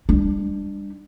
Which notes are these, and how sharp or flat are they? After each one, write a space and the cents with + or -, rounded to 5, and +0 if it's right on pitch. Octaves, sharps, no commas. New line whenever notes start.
G3 +35 D4 +0